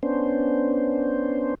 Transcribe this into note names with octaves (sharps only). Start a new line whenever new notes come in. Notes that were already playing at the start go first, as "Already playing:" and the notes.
B3 C#4 D4 C5